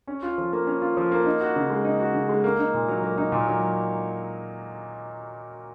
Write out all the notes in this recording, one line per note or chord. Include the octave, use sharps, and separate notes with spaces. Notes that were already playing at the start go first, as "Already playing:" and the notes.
C#4
F4
F3
A#3
C#4
F4
F3
A#3
D#4
F#4
C#3
G#3
D#4
F#4
C#3
G#3
A#3
D#4
A#2
F#3
A#3
D#4
A#2
F#3